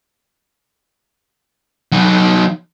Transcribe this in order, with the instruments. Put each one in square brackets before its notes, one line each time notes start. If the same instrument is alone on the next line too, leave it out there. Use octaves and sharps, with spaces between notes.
[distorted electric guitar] F#3 D#4